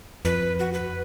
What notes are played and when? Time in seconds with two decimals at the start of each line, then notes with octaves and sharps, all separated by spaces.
0.25 F2 B4
0.59 F#4
0.74 B4